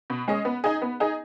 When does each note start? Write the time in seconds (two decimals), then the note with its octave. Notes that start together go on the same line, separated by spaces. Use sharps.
0.10 B2
0.28 G#3 C#4 G#4 D#5
0.45 B3
0.64 D#4 G#4 D#5
0.82 B3
1.00 D#4 G#4 D#5